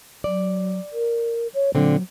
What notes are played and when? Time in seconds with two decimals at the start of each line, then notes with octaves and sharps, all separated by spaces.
0.24 F#3 D5
0.93 A#4
1.54 C#5
1.75 A#2 D3 F#3 C4